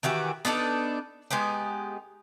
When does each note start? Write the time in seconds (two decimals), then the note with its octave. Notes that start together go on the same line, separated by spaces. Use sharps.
0.03 D#3 E3 F#4 G4
0.45 B3 D4 D#4 A4
1.31 G#3 B3 D#4 G4